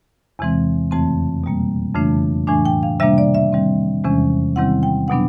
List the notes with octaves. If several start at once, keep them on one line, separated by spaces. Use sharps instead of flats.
E2 C3 E3 G#3 C4
F2 C#3 E3 A3 C4 A5
B2 G3 A#3
F2 C#3 E3 A3 D4
A2 E3 A3 D4 G#5
G5
F5
C3 D#3 G3 A#3 D4 E5
D5
E5
D#3 G3 C4
E2 C3 E3 G#3 C#4
C3 D#3 G3 C4 E4 F#5
G5
B2 F#3 B3 D4 F#5